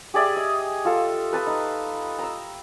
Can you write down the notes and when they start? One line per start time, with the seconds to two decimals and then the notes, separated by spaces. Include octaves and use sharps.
0.14 G4 G#4 D5 E5
0.36 D#5
0.85 F4 A4
1.33 B4 A5 D#6
1.47 D#4
2.19 A#5 E6